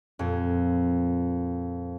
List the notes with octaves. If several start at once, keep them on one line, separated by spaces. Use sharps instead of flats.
F2 A#2